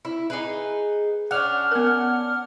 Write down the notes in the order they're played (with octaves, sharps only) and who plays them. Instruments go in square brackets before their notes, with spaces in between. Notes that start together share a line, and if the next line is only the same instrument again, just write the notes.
[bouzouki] E4
D#4 G#4 B4
[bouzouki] C#4 D4 [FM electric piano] F#5 F6
[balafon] B3 A#4